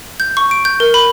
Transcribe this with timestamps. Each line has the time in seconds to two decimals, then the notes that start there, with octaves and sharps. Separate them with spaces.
0.20 G6
0.37 C#6
0.51 D7
0.65 G6
0.80 A#4
0.94 B5